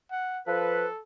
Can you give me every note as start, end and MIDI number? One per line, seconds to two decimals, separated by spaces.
0.11 0.40 78
0.47 0.85 53
0.47 1.00 69
0.47 0.85 71